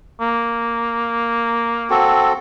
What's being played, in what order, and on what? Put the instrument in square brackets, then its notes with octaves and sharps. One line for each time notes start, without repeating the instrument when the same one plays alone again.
[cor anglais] A#3
[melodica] C4 F#4 A4